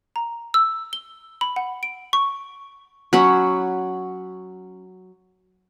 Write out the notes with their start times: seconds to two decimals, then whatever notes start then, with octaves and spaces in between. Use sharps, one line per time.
0.16 A#5
0.54 E6
0.93 G7
1.41 B5
1.56 F#5
1.83 D7
2.13 C#6
3.13 F#3 C#4 F#5 B5